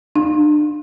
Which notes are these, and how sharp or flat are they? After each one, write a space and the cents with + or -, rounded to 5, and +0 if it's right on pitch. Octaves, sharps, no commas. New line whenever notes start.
D4 +35 F5 +20